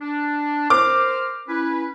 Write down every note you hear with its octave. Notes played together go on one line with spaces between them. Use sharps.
D4
A#4 C5 D6 F6
C#4 E4 B4